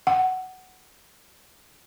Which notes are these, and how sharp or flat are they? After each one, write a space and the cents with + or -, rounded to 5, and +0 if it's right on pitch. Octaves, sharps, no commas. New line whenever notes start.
F#5 +10